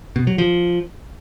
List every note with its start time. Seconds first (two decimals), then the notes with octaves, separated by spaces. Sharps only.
0.16 B2
0.27 F#3
0.38 F3